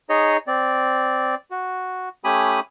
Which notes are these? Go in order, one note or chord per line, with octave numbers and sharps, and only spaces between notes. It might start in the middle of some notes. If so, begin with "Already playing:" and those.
D#4 G#4 C#5 D#5
C4 D5
F#4
A3 C#4 G4 G#5 B5 D#6